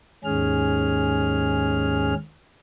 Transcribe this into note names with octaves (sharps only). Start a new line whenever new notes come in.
D#2 G#2 C#4 G#4 F6